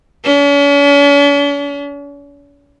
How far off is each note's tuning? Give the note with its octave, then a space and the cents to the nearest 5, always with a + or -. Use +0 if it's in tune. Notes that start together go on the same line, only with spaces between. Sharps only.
C#4 +45